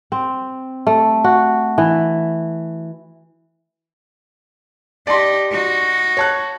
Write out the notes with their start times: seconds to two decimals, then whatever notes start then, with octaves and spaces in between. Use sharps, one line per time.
0.12 C4
0.87 A3
1.24 F#4
1.78 E3
5.07 D#4 G4 D5 A5 C6
5.51 D#4 F#4
6.17 C#5 A5 F#6